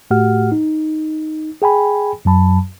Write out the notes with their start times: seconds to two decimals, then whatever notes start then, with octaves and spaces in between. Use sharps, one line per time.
0.10 A2 A3 F#4 G4 F#5 F6
0.52 D#4
1.62 G#4 G5 G#5 B5
2.25 F#2 F#3 A5 B5